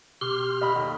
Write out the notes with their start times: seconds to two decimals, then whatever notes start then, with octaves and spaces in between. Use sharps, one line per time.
0.21 B2 G4 C6 F6
0.61 D#5 B5
0.76 D#2 A4